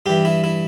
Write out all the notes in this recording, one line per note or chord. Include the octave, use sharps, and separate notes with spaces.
G2 E3 G4
E4
E4